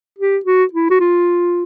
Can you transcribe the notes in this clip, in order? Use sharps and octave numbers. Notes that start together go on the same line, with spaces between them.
G4
F#4
E4
F#4
F4